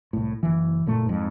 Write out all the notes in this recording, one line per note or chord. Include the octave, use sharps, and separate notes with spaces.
C2 A2
F#1 E3
F#1 A#2 A3
F2 G#2